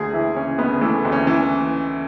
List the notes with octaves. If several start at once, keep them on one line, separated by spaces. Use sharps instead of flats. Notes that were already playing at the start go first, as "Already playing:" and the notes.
Already playing: D2 G#4
E3 E4
C#3 C#4
D2 B3
E3 A3
D2
C#4
E3